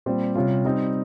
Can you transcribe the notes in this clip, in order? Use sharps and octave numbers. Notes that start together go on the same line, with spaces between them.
A#2 G3 C4 G4 C5
C3 G3 C#4 F4
G3 C4 D#4